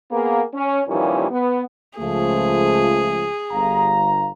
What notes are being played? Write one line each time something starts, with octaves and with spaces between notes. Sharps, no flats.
A#3 B3 G#4
C#4
D#2 A#2 E3 F3 G3 C#4
B3
C#2 F3 A3 G#4
G1 F5 A#5